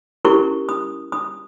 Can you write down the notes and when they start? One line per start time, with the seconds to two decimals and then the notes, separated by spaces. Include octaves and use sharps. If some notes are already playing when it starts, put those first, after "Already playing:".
0.25 C#4 E4 G4 A#4 C#6
0.69 D#6
1.12 D#6